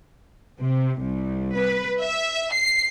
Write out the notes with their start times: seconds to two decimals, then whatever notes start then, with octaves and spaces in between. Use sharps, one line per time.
0.60 C3
1.00 C2
1.57 B4
2.00 E5
2.53 C7